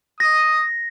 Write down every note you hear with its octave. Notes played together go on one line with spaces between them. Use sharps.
D#6 A#6